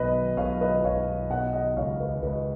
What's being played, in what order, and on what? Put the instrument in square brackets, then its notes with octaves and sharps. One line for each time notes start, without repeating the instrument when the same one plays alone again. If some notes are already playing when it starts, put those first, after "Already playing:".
Already playing: [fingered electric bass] B1 B2 [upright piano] B4 D#5
[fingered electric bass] B1 [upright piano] C#5 F5
[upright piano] B4 D#5
[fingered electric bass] B1 [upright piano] C#5 F5
[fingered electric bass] B2 [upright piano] D#5 F#5
[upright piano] D#5 F#5
[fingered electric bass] C#2 [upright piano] C#5 F5
[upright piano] B4 D#5
[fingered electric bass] C#2 [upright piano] B4 D#5